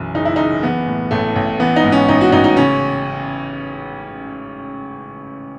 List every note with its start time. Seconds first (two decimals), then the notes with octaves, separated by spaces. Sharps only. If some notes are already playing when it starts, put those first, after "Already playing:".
Already playing: B1 F#2 E3
0.15 F#1 D#4
0.25 E4
0.36 F#1 D#4
0.63 E3 B3
0.87 A2
1.11 A1 A3
1.36 A1
1.60 E3 B3
1.76 D#4
1.83 G#2
1.92 C#4
2.08 A1 D#4
2.21 F#4
2.32 A1 D#4
2.44 D#4
2.56 C#3 C#4